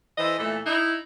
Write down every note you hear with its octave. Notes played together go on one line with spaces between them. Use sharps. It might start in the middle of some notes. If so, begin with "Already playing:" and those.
E3 A4 C5 D#5
A#2 E3 A3 A4
D#4 E4